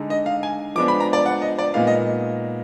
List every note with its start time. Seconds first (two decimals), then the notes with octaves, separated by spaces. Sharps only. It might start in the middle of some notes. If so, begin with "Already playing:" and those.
Already playing: D3 G#3 D#4
0.10 D#5
0.26 F5
0.43 G#5
0.75 F3 G#3 B3 D4 D6
0.88 B5
1.00 A#5
1.13 D5
1.26 F#5
1.42 D#5
1.59 D5
1.74 A#2 G#3 B3 D#4 F5
1.87 D#5